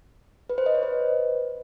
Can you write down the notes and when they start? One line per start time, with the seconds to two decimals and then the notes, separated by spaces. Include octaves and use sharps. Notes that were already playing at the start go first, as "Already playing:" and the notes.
0.50 B4
0.58 C5
0.66 D#5
0.75 C#5
0.83 B4